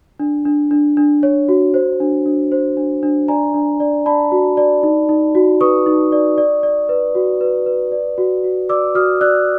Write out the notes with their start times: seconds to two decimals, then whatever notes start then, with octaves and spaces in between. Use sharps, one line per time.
0.20 D4
0.45 D4
0.71 D4
0.97 D4
1.23 C#5
1.49 F#4
1.74 C5
2.00 D4
2.26 D4
2.52 C5
2.77 D4
3.03 D4
3.28 D5 G#5 A#5
3.54 D4
3.80 D5
4.06 D5 A5 B5
4.32 F#4
4.57 D5
4.83 D#4
5.09 D#4
5.35 F#4
5.61 B4 C#6 D#6
5.86 D#4
6.12 D5
6.38 D5
6.63 D5
6.89 B4
7.15 F#4
7.41 B4
7.66 B4
7.92 D5
8.18 F#4
8.44 F#4
8.69 D5 D6 E6
8.95 F#4 D#6 F6
9.21 D5 E6 F#6